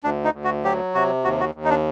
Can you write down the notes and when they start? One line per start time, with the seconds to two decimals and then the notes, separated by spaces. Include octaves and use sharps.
0.04 D2 D4
0.24 D#4
0.34 D2
0.44 F#4
0.64 F#3 G4
0.95 C3 F#4
1.24 D#2 F#4
1.40 F#4
1.55 D#2
1.64 D#4
1.70 D4